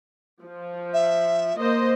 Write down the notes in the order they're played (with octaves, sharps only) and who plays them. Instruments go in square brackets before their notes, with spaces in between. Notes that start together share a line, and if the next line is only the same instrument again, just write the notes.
[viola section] F3
[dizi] E5
[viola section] A#3 C5 D#5